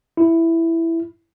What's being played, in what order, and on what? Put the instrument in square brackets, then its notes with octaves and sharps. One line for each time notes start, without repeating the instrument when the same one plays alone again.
[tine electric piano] E4